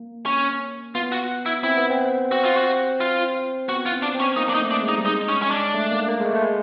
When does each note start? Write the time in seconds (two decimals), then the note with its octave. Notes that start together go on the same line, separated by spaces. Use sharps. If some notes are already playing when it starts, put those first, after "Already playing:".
Already playing: A#3
0.26 C#4
0.95 B3 F4
1.12 F#4
1.46 E4
1.63 C4 E4
1.77 B3
1.91 C4
2.31 C4 F#4
2.45 F4
2.57 F#4
3.00 F4
3.68 B3 F#4
3.86 F4
3.92 C4
4.03 D4
4.15 C4
4.20 C#4
4.36 A#3 D#4
4.49 D4
4.54 D#4
4.60 A3
4.71 D4
4.83 G#3
4.88 D#4
4.98 G3
5.05 G#3 D#4
5.28 C#4
5.42 C#4
5.51 D4
5.74 A3
5.91 A#3
6.08 A#3
6.20 G#3
6.25 A3
6.35 A3
6.42 G#3